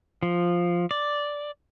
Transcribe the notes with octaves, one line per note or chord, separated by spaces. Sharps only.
F3
D5